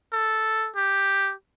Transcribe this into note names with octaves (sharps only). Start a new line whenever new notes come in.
A4
G4